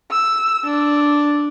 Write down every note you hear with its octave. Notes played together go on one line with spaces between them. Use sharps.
E6
D4